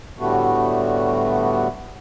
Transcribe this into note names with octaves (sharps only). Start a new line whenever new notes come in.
A2 D3 G3 A3 B3 F#4